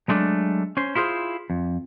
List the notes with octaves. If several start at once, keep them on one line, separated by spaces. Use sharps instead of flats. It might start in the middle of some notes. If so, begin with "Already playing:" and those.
F#3 G#3 A3 D4
C#4 C5
E4 F4 G#4 B4 C5
F2